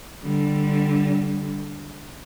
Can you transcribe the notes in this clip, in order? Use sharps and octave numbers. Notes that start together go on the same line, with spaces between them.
D3 G3